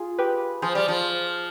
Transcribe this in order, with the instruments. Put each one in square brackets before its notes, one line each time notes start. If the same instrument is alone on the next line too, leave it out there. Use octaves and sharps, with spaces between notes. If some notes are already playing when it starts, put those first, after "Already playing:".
Already playing: [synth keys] F4 G#4
G4 B4
[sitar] F3 [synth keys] G#4 C5
[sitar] G3
F3